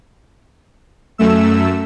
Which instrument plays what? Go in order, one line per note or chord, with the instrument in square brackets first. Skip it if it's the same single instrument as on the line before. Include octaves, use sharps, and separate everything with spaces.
[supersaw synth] F#2 A3 E6